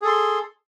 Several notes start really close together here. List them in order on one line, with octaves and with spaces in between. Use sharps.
G#4 A4 C6